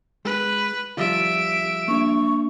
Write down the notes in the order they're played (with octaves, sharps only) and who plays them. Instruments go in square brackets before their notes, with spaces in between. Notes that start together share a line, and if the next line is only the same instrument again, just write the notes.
[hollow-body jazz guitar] G#3 [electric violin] B4
[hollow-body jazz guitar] F3 G3 F4 [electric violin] E5 D7
[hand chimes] A#3 D4 [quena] C#6